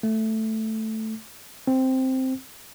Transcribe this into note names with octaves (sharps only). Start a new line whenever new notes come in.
A3
C4